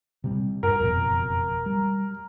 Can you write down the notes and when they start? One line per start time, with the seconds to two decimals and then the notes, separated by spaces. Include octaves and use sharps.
0.24 C3 G3 C4
0.63 G2 A#4
0.80 F#1 F2 B2
1.66 G3